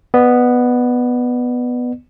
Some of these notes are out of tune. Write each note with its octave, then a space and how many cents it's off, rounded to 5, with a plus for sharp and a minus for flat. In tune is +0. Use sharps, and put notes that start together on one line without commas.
B3 +0 D5 +40